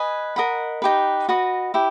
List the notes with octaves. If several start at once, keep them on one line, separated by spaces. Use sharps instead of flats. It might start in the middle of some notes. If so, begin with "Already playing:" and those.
Already playing: B4 D#5 G#5
A#4 D#5 F#5 B5
D#4 G4 B4
F#4 B4 D#5
E4 G4